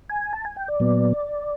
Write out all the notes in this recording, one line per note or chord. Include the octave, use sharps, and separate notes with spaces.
G#5
A5
G#5
G5
D5
A#2 F#3 B3